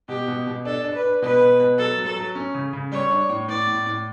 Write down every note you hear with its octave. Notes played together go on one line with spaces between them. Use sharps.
B2 G4
B2
B2
D4 A4
D4
B4
D4
B2 B4
B2
B2
F#3 A4
F#3
A4
F#3
C#4
C#3
C#3
G3 C#5
D4
A2
A2 D5
A2
A2